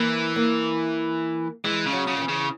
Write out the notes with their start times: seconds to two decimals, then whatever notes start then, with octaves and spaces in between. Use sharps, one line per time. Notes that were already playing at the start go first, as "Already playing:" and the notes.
Already playing: E3 A#3
0.36 A#3
1.64 E3 G#3
1.86 C#3
1.93 F#3
2.07 C#3
2.17 D#3
2.21 E3
2.29 C#3